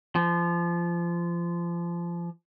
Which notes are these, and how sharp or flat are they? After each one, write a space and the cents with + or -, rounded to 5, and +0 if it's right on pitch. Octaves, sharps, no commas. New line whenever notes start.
F3 -25